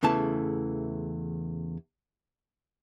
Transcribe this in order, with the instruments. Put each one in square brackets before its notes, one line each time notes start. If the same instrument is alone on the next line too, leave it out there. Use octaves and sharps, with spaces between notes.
[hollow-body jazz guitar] E2 C#3 E3 A3 A5